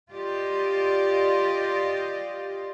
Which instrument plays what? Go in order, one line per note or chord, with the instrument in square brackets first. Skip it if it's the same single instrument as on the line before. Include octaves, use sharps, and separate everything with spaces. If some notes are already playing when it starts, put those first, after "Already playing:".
[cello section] F4 G4 D5 D#5